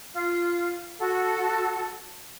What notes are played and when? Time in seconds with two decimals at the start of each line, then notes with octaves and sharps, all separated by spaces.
0.13 F4
0.98 F#4 A4